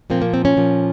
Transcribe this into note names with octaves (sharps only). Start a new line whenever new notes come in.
A#2 F3 A#3 C4
A#3
C4
C#4
A#2 F3 A#3